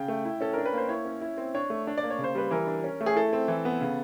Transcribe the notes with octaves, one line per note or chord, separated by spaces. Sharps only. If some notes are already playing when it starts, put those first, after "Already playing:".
Already playing: C#3 G5
A3
E4
C#4 A4
D4 A#4
B4
A#3 C5
E4 C#5
C#4
E4
C4
D4 C#5
A3
D4
D5
A#3
C#5
C#3
C5
G3 B4
E3 A#4
D4
C#4
A3
G#4
E4 A4
C4
E3
B3
C#3